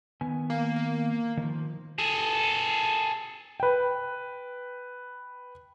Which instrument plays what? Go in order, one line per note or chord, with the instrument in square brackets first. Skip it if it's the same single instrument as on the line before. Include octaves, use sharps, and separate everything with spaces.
[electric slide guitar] D#3 B3 G#5
[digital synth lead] A#3
A#3
[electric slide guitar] D#3 F3
[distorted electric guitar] G#4 A4
[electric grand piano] B4 G5